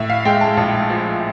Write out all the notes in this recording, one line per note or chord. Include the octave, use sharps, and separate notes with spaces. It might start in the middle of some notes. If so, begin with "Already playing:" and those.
Already playing: A2 E5
F5
G#3 G5
A5
A#1 A5
F3